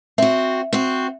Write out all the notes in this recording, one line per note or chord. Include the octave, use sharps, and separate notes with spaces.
C4 F#4 E5
C4 F#4